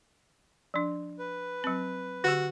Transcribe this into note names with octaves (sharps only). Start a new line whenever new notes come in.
F3 D4
B4
F#3 C4
D3 F#4 G4